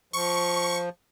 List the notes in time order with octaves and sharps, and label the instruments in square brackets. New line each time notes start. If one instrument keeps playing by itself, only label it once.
[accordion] F3 [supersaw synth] C#6